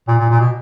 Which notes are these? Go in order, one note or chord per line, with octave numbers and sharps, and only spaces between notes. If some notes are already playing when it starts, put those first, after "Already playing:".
A#2
A#2
A#2
B2